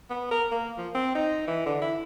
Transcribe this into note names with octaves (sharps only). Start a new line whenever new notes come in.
B3
A#4
A#3
F3
C4
D#4
E3
D3
E4